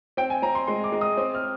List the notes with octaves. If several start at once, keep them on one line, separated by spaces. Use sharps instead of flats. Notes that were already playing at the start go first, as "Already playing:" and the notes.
C4 G5
G#5
C4 A#5
C6
G#3 C6
D6
G#3
D#6
C4
F6